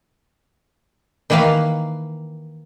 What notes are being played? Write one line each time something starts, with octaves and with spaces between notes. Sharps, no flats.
D#3 E3 A#3 B4 F5